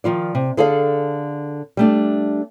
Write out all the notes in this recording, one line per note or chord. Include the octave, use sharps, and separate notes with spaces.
D#3 F3 F4 D5
C3
D3 G#4 A4 D5 D#5 F5
G3 A3 D4